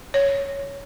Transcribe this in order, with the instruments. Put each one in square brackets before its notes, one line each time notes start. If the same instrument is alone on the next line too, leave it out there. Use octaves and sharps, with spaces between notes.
[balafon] C#5